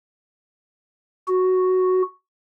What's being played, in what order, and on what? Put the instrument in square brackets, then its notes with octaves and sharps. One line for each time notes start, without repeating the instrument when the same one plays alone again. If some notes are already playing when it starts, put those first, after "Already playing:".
[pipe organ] F#4